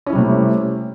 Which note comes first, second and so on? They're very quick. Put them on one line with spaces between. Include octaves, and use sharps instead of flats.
C#4 E4 G3 C3 A3